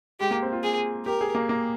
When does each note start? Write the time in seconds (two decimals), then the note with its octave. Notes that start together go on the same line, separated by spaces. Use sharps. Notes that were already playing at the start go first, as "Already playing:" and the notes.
0.20 G#3 G4
0.31 A#3
0.42 C4
0.53 F4
0.63 G#4
1.06 G4 A#4
1.21 G#4
1.35 A#3
1.49 A#3